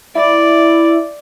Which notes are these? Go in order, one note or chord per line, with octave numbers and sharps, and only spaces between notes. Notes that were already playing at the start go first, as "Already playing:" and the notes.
E4 D5